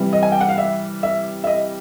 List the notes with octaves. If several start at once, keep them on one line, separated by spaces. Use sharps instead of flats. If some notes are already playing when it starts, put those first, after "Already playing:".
Already playing: C3 E3 G3
D#5
G#5
G5
F#5
F5
E5
E5
E5
D#5